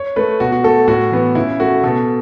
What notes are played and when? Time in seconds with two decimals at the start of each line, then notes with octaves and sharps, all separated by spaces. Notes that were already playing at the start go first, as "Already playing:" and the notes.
Already playing: C#5
0.16 A3 B4
0.40 B2 F#4
0.52 F#4
0.64 A3 A4
0.88 A2 F#4
1.11 E3 B3
1.35 C#3 E4
1.60 A3 F#4
1.83 B2 A4